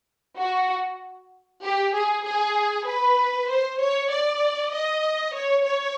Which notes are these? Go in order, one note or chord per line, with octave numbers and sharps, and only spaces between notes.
F#4
G4
G#4
G#4
B4
C5
C#5
D5
D#5
C#5
C#5